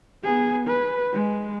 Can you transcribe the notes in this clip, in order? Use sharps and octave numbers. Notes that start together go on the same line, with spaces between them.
B3 G#4
B4
G#3